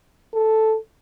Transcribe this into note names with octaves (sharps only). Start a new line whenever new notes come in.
A4